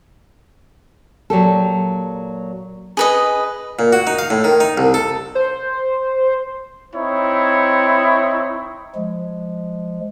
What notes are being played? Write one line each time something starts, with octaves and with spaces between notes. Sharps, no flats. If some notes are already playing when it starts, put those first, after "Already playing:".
A#2 F#3 G4 A4
G#4 B4 D#5
A#2
F#4
D#4
F5
A2
D#3
D#4
C2
A4
C5
C4 D#4 E4 C#5
F3 G#3